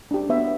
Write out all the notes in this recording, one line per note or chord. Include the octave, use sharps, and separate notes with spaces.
D4 G4
B3 E5